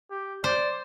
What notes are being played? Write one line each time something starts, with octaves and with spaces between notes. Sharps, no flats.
G4
C5 D5